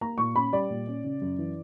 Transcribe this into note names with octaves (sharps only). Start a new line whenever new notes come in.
A#3 A#5
A#2 C#6
C#4 B5
G3 D5
A#2
C#4
C#3
F#2
E3